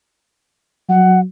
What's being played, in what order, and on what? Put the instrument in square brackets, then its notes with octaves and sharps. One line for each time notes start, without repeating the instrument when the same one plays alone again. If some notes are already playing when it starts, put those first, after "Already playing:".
[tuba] F#3 [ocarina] F#5